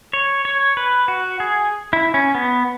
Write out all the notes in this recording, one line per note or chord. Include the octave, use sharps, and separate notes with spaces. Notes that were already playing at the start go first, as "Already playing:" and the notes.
C#5
C#5
B4
F#4
G#4
E4
C#4
B3